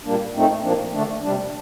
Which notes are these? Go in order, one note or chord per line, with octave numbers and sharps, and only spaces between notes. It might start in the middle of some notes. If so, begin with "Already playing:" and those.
A#2 G3 A#3 D4
A#2 A3 C4 D#4
A#2 F3 A#3 D4
D3 A3 D4
C3 G3 D4